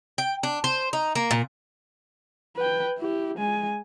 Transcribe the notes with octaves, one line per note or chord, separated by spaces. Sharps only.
G5
D4
C5
D#4
A#3
A#2
B4 G5
E4 G4
G#3 G#5